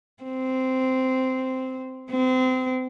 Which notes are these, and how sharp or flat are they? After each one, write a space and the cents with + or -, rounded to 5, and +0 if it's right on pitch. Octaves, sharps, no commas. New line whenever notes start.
C4 -10
C4 -30